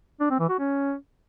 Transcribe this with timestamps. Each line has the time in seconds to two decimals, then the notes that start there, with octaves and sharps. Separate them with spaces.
0.20 D4
0.30 C4
0.40 E3
0.49 F#4
0.59 C#4